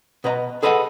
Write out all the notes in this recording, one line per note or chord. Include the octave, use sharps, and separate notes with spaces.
B2 B4 D#5 A#5
G#4 A4 B4 D#5 E5 F#5